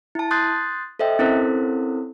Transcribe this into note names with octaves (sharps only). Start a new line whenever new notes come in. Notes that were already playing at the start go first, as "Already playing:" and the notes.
E4 A5
C6 D#6 F#6 G6 A6 C7
A4 C5 D#5 E5 G5
C4 C#4 E4 A4 A#4 C5